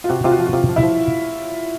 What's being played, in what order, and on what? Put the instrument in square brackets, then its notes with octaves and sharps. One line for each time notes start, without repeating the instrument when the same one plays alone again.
[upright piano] F4
[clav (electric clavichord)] C3 [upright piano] F#4
[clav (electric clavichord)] C3 [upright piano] F4
[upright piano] F#4
[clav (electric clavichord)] F3
[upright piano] F#4
[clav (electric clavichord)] C3 [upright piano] F4
[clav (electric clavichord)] F3
[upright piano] E4
[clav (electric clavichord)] F3